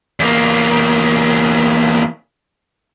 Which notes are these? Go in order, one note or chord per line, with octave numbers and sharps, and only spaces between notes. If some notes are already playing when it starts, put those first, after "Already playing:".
E2 A#3